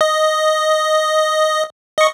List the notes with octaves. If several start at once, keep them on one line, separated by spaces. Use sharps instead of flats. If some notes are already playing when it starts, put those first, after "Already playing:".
D#5
D#5 C#6